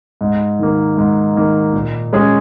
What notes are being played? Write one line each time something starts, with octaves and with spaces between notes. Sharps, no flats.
G#2
D#3 A#3
G#2
D#3 A#3
A#2
G#3 C#4 G#4